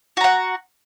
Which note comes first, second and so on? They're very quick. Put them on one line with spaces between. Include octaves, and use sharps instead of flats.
F#4 A#5 F#5